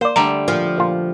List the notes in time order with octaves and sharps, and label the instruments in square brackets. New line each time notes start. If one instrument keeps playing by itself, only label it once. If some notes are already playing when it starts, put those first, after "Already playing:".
[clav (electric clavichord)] A#3 D5 [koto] C5
[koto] D3 G3 A3 [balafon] A#5
[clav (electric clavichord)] A#2 [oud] F3
[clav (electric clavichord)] A#2 F4